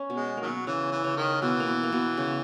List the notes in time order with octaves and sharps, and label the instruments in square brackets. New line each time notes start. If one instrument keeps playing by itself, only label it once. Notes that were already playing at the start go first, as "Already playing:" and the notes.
Already playing: [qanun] C#4
B2 B3
[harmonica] G#3
[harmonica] D#3 F#3 [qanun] A#3
[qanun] B2 B3
[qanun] C#3 C#4 [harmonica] E3
[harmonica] E3
[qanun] C#3 C#4
[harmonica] D#3
[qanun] B2 B3 [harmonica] E3
[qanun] A#3
B2 B3
A#3
B2 B3
C#3 C#4